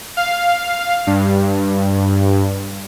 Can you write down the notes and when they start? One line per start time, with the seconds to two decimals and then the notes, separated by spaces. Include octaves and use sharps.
0.17 F5
1.07 G2